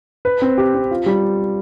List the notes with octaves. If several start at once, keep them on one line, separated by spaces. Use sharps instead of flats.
B4
C4
G4
C4
F4
G3